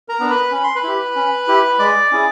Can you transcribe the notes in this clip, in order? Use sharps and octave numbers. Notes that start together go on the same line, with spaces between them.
A#4 A#5
B3 D4
B4 B5
C#4 B5
C6
B4 B5
E4 G4
C#4
E4 G4
G#3 D5 D6
C#4 E4 G#4